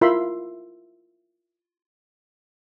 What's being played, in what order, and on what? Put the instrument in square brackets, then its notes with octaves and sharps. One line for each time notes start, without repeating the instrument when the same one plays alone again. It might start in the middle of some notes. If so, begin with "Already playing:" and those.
[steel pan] E4 F4 A#4 E5 B5 C6